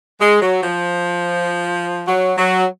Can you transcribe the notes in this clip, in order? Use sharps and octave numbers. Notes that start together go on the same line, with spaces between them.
G#3
F#3
F3
F#3
F#3